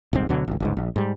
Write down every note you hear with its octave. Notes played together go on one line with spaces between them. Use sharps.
D#1 C2 G#2 C4
D2 B2 D3 F#3
G#1 C#2
G1 C#2 G#2
A#1
G#2 G3